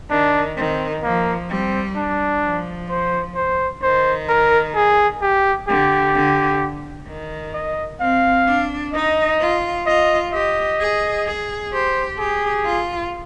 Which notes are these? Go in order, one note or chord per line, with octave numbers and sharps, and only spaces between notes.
D#3 D4
D#3 C4
F3 A#3
G3 C4
D4
F3
C5
C5
D#3 C5
A#4
G#4
G4
D3 G4
D3
D#3
D#5
C4 F5
D4
D#4 D#5
F4
F4 D#5
G4 D#5
G#4
G#4
G4 C5
G4 G#4
F4